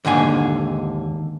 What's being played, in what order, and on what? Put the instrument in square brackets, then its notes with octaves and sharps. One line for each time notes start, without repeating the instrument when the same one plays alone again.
[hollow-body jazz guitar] D#2 G#2 D3 G#5